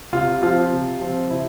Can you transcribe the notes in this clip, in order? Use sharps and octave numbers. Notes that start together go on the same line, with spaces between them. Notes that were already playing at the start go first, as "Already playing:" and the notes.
C3 F4
F3 C4 F4
C3
F3 C4
C3 E4